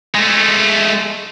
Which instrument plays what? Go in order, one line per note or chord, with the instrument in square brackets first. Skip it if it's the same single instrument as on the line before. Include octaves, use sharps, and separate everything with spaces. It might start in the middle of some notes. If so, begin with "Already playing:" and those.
[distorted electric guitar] G#3 A3